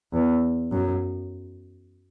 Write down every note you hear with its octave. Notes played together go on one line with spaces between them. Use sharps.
E2
F#2